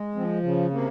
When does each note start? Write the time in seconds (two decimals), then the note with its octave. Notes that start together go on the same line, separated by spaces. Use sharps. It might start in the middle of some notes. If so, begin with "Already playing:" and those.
Already playing: G#3
0.15 F3 C4
0.43 C#3
0.71 C3 A#3